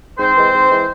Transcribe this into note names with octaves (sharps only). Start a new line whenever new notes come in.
G#2 C4 C5
E3 G#3
G#2
E3 G#3